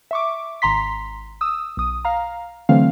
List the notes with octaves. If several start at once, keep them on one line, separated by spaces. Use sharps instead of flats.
E5 C#6 D6
G#1 A#5 C6 B6
D#6 E6
B1 D#6
F5 A#5
D3 E3 F#3 A3 C4 F5